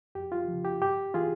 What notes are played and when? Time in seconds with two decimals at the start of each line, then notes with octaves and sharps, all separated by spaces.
0.15 F2 G4
0.32 F4
0.48 C#3 F3
0.65 G4
0.82 G2 G4
1.14 E3 F4 G#4